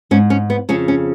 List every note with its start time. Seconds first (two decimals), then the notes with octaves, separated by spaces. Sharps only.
0.11 G#2 C#4
0.30 C#4
0.50 B3
0.69 F2 C#3 C#4
0.88 C#4